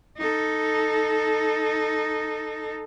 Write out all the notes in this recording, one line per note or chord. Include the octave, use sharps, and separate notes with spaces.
D#4 A4